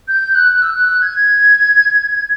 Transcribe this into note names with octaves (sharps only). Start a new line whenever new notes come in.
G6
F#6
E6
F#6
F#6
G#6